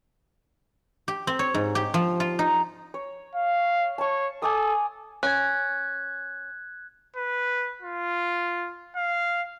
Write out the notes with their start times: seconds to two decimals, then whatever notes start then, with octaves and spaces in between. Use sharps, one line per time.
1.08 G4
1.27 C4
1.39 C#5
1.54 G#2
1.75 G4
1.94 F3
2.20 F4
2.39 D#4
2.94 C#5
3.35 F5
3.98 C#5 A5 C#6
4.42 A4 G#5 D6 D#6
5.23 C#4 F#6 G#6
7.16 B4
7.82 F4
8.96 F5